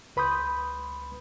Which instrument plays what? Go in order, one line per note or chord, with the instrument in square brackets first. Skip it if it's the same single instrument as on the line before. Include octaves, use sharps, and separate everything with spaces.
[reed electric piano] C#2 B4 B5 C6 D#6 G6